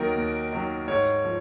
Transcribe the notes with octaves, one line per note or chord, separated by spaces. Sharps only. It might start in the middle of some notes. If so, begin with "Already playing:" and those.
Already playing: D#2 D#3 F#3 A#4
D#2
D#3 F#3
G#2 C#5
F3